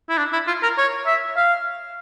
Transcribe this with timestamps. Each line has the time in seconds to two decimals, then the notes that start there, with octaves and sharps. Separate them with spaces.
0.09 E4
0.18 D4
0.33 E4
0.47 F4
0.63 A#4
0.78 C#5
1.06 E5
1.36 F5